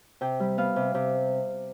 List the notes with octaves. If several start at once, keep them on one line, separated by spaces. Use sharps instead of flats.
C3 G5
G3
B3 F5
C3
C3